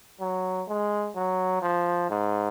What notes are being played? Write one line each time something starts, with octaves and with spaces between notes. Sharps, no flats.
F#3
G#3
F#3
F3
G#2